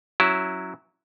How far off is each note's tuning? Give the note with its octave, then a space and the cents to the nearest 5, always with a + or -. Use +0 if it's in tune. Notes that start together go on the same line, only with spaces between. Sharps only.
F#3 +0 C#4 +0 E4 -5